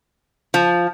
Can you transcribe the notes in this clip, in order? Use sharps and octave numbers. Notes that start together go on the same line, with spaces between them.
F3